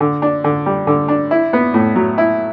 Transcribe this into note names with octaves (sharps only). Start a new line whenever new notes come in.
D3
D4
D3
G3
D3
D4
E4
B3
A2
F#3
E4